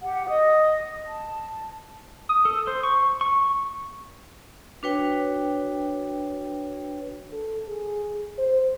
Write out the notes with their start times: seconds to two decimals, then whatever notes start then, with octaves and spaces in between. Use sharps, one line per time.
0.02 G4 F#5
0.28 D#5 D#6
1.06 A5
2.29 D#6
2.45 A4
2.67 C5
2.83 C#6
3.21 C#6
4.83 D4 F#4 B4 C#5 G5
7.32 A4
7.68 G#4
8.38 C5